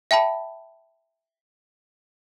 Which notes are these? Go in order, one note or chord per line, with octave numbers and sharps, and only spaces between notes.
E5 G5 A5 B5